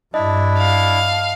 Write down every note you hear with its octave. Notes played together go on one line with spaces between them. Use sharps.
G2 D4 E4 D#5
F5